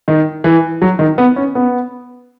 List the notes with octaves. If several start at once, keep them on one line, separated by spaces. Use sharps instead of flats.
D#3
E3
F#3
D#3
B3
C#4
B3